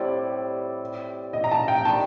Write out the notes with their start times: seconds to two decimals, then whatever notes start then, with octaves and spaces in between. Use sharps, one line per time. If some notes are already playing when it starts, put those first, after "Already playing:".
Already playing: A2 G3 C4 G4 D5
1.33 D#5
1.44 A#5
1.51 A5
1.68 G5
1.85 D#3 G3 D4 A5